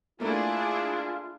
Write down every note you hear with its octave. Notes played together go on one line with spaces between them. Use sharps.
A3 A#3 D4 E4 F4 G#4